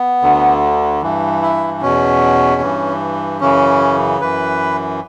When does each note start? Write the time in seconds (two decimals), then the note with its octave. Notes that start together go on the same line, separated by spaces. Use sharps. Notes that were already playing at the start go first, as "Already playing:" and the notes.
Already playing: B3
0.22 D2 D3
1.02 G2 E3
1.42 E4
1.82 E2 B2 C#4
2.61 G2 E3
3.41 F#2 C#3 E3 C#4
4.21 F#2 E3 B4